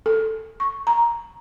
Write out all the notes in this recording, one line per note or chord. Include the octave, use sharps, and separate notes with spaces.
A4
C#6
A#5